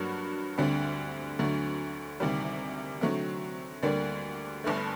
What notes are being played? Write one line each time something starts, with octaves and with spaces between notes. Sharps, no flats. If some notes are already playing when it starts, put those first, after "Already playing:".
Already playing: G2 F#3 A#3 F#4
D2 D3 G3 C4
D2 D3 F#3 A3
D2 C3 D#3 G3
D3 F#3 A3 C4
D2 D3 G3 A#3 D4
G1 G2 D3 A3